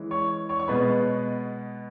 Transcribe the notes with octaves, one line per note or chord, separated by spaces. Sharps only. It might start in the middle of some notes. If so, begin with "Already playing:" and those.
Already playing: E3 G#3 C#4
C#5 C#6
C#5 C#6
C#6
B2 G#3 B3 B4 B5